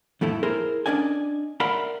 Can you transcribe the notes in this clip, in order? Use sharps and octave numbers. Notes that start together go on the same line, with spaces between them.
F2 A2 A3 E4
E4 G#4 A#4 C5 C6
C#4 D4 D5 D#5 G#5
A#4 D5 E5 F#5 B5 C6